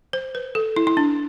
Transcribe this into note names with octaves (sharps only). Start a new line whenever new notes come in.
C5
B4
A4
E4
E4
D4